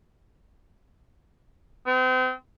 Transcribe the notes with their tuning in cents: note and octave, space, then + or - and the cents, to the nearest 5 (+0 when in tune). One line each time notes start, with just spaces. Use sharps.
C4 -35